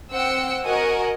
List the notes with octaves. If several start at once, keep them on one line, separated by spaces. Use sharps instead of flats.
C4 F#5 G5 E6 C#7
F#4 A#4 D#5 F#5 G#5